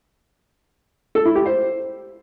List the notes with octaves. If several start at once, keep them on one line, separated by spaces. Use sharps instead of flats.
A4
E4
G4
C5